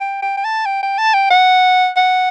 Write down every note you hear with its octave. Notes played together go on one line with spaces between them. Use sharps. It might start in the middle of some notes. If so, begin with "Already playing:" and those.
G5
G5
G5
A5
G5
G5
A5
G5
F#5
F#5